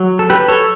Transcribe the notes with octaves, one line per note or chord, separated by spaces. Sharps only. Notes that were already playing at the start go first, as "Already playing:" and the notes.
Already playing: F#3
A4
F#3 G4 B4
A4 C#5